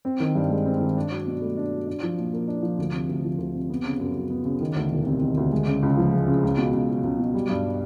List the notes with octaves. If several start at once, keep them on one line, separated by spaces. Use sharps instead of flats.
C4
D#3
G2
G#3
C4
D#3
D4
F#3
B2
A3
D4
F#3
D4
F3
A#2
A#3
D4
F3
D2
C3
D2
F3
D2
C3
B3
C#3
F#2
F#3
B3
C#3
D#3
D2
E1
C3
D#3
D2
G#3
C#3
C#2
F3
G#3
C#3
C#2
B2
C#2
F#3
C#2
B2
G3
G2